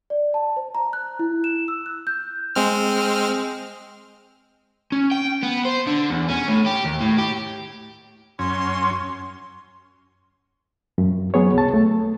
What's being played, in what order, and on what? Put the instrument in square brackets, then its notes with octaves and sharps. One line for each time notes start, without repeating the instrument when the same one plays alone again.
[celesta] D5
A5
C5
A#5
F#6
E4
E7
E6
F#6
G6
[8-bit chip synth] G#3 C4 F6
[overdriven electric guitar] C#4
G5
B3
C5
D3
E2
C#4
A2
G4
D#2
A2
G4
[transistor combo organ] F#2 C#4 [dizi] C6
[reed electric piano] F#2
F#3 B3 G#4 C#5
C2 A5
A3